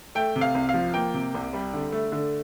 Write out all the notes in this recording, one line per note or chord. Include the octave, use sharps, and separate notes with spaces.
A3 G5
C3
F5
C2
F5
F3
A#3 G5
C3
C2
G3
D3
A3
D3